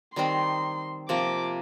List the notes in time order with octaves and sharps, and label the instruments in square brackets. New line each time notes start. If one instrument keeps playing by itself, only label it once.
[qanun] D#3 G3 C4 D#4 [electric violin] C6
[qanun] C3 F3 A#3 [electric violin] D6